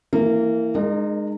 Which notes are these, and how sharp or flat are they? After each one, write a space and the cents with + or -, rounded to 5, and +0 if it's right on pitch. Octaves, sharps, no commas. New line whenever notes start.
E3 +0 A#3 -25
G#3 +0 D#4 -40 A#4 +0